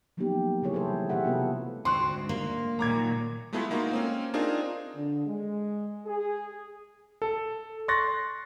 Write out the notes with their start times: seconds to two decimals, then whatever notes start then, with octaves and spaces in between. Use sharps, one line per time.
0.17 F3 F#3 A#3 B3 D#4 G4
0.62 C#3 F#3 E4 G#4 C#5
0.73 G3 A4 B4 C5
0.88 E3
1.09 C3 A3 G4 G#4 E5 F#5
1.24 B3 C4 F4 F#4 A4 B4
1.85 D2 G#2 C4 C6 C#6 F#6
2.29 A#3
2.79 A#2 D#3 F#3 A#5 D6 G#6
3.53 G#3 A3 B3 E4 F4 G#4
3.70 G#3 A#3 D#4 F4 F#4
3.91 A#3 C4 C#4
4.34 C4 D4 D#4 F4 G#4 A#4
4.95 D3
5.26 G#3
6.06 G#4
7.22 A4
7.88 C6 C#6 F#6 A6 A#6